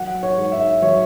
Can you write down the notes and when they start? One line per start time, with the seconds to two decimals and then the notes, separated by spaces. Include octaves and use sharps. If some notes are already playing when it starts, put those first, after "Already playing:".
Already playing: F#3 F#5
0.23 C#5
0.37 G#2
0.52 E5
0.82 F#3 C#5